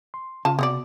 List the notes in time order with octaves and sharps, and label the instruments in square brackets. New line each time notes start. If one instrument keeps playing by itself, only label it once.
[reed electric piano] C6
[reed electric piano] C#3 [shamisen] F4 A5
[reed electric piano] C3 [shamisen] B3 F#4 D5